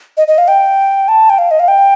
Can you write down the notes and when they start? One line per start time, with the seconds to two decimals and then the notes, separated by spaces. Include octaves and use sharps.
0.17 D#5
0.28 D#5
0.38 F5
0.48 G5
1.08 A5
1.30 G5
1.38 F5
1.51 D#5
1.59 F5
1.68 G5